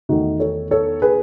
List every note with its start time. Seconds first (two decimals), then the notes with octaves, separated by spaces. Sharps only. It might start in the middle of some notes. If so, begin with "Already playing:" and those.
0.09 E2 D#3 A3 D#4 F#4
0.40 A4 C#5
0.71 A4 C#5
1.02 G#4 B4